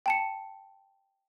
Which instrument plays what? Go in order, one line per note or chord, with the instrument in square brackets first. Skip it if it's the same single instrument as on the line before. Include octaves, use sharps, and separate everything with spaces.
[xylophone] G5 A5 C#7